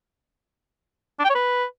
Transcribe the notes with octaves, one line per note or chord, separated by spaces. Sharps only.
D4
G5
C#5
B4